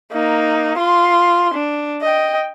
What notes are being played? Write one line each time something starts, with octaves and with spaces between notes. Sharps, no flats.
A#3 D#4
F4 C6
D4
D#5 G5